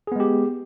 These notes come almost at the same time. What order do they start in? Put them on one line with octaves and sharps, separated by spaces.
G#4 B3 G#3 G4